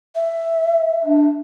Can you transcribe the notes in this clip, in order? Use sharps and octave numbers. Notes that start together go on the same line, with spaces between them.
E5
D4